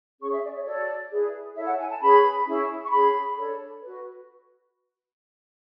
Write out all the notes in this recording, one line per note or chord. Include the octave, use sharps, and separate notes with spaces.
C#4 G#4 C#5 C#6
E5
D5
C#5
F#4 A4 C#5 D5
E4 G#4 B4
E4 A4 C#5 E5
F#5
G#5
A5
C#4 G#4 B4 B5
C#4 E4 G#4
C#6
C#4 G#4 C#5 B5
D4 A4 C#5
F#4 B4